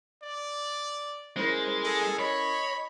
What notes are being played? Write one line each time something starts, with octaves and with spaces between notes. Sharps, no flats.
D5
G#3 C#4 E4 A#4 C5
G#4 A4
C#5 D#5 B5